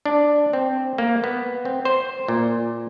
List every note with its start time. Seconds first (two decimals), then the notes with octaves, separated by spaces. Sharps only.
0.06 D4
0.53 C4
0.98 A#3
1.24 B3
1.65 C4
1.85 C5
2.28 A#2